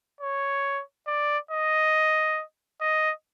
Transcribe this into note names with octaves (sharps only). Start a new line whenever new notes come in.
C#5
D5
D#5
D#5